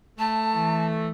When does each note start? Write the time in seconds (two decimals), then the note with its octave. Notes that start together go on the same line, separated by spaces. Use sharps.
0.19 A3 A5
0.51 E3